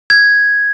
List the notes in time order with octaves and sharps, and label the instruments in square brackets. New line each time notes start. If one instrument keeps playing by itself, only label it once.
[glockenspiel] G#6